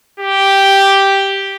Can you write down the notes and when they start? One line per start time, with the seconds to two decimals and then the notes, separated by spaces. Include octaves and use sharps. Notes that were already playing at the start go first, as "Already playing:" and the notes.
0.20 G4